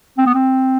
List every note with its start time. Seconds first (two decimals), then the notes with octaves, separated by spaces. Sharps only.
0.18 C4
0.27 B3
0.35 C4